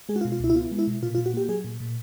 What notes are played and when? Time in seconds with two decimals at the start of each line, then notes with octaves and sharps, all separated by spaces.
0.09 G#3 G#4
0.16 F#4
0.21 F4
0.25 B2
0.32 F4
0.40 C#2 E4
0.50 E4
0.55 B3 F4
0.71 G#3
0.79 E4
0.87 B2
1.03 A#2 F4
1.15 F4
1.18 A#2
1.26 F#4
1.34 A#3 G4
1.49 F#3 G#4
1.64 A#2
1.80 A#2